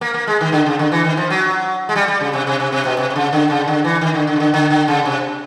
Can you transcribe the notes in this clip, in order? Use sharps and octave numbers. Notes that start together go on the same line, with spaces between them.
A#3
A#3
G#3
D#3
D3
C#3
D3
E3
D#3
F3
F#3
G#3
G3
G3
C#3
C3
C3
C3
C3
B2
C3
C3
C#3
D3
C#3
D3
E3
D#3
D3
D3
C#3
D3
D3
D3
C#3
C3